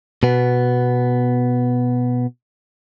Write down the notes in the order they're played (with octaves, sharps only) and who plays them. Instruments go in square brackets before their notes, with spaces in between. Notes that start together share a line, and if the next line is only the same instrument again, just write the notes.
[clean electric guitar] B2 B3